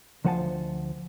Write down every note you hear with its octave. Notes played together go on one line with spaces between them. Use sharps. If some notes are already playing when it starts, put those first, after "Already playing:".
D2 F3 C5 F#5 G#5 A5